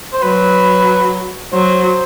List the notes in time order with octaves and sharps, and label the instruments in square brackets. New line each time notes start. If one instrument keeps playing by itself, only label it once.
[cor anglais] C5
[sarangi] F#3 [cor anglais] B4
[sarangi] F#3 [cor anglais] C5